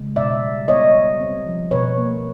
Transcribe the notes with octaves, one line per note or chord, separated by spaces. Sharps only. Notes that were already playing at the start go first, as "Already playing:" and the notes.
Already playing: C#3 G#3
B2 D5 E5
G3
B3 C#5 D#5
G3
C4
F3
B2 B4 C#5
A#3